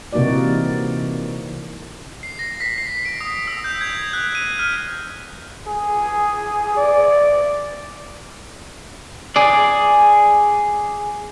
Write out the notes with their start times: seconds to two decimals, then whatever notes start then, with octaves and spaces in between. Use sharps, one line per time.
0.13 C3 E3 A#3 D#4 F#4 D5
2.23 C7
2.39 A#6
2.60 B6
2.78 C7
3.05 D7
3.21 D#6
3.47 E6
3.64 G6
3.81 G#6
4.13 F#6
4.35 D#7
4.59 F6
5.67 G#4
6.77 D5
9.36 G#4 D5